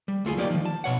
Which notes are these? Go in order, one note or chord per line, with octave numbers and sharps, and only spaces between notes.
G3
D2 A3 F4 G#4
F#3 A#3 D#4 G4 D5
D#3 F3
A5
B2 C#5 F#5